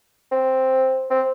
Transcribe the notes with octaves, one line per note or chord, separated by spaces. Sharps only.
C4
C4